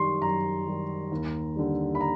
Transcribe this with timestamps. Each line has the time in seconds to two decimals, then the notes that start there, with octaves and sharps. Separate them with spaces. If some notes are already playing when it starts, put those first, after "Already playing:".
Already playing: F#2 D#3 G3 C6 C#6
0.22 F#2 A#5
0.66 D#3 G3
1.12 D#2
1.56 D3 G3
1.95 B5
2.01 A#5